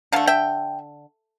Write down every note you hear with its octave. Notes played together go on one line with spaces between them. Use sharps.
D3 A3 F5 A5
E5 G5